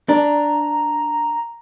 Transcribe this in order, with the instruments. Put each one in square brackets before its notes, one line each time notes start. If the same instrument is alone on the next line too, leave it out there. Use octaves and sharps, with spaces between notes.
[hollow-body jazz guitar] D4 [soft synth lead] A#5